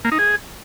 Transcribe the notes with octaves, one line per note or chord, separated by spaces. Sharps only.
A#3
D#4
G#4